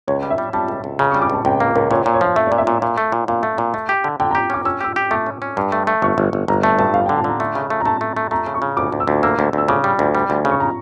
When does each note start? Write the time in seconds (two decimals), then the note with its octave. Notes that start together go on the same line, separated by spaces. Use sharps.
0.08 C#2 C#5
0.23 G3
0.30 E5
0.38 G3
0.53 G3 A5
0.68 C#2
0.84 C#2
0.99 C#3 A#5
1.11 C#6
1.14 G3
1.22 D6
1.30 C#2 A5
1.45 C#2 G5
1.60 A#3 F5
1.76 C#2 A#4
1.91 A#2 C#5
2.02 C#5
2.06 A#2
2.14 C#5
2.21 F3 F5
2.36 A3 E5
2.47 A#2 D5
2.58 E5
2.67 A#2
2.82 A#2
2.98 A3
3.12 A#2
3.28 A#2 F5
3.43 A3
3.58 A#2
3.74 A3
3.89 G4
4.04 D3
4.20 D3 G5
4.31 A#5
4.35 G4
4.50 C#4 D6
4.65 C#4 E6
4.81 G4 E6
4.96 G4
5.11 A3 D6
5.26 C#4
5.42 C#4
5.57 G2
5.72 A3
5.87 A3
6.02 G1 C#6
6.18 G1
6.33 G1
6.48 G1 A#5
6.63 A3 A5
6.79 G2 A5
6.94 G1 F5
7.06 G5
7.09 D3
7.17 A5
7.24 D3 A#5
7.40 A3
7.55 C#3
7.70 A3
7.80 A#5
7.85 A3 A5
8.01 A3
8.17 A3
8.31 A3 A#5
8.46 C#3
8.54 C#6
8.62 C#3
8.77 D2 D6
8.92 D2
9.00 E6
9.08 D2
9.23 A#3 E6
9.39 D2
9.53 D2 E6
9.68 C#3 D6
9.84 G3
9.99 D2
10.15 G3
10.30 D2
10.45 C#3
10.50 C#6
10.60 A#5